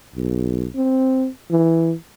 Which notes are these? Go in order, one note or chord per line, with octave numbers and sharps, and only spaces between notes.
B1
C4
E3